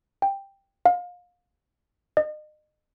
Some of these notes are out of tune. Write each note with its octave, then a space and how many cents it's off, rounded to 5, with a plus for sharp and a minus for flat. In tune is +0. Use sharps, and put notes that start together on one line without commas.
G5 +10
F5 +30
D#5 -35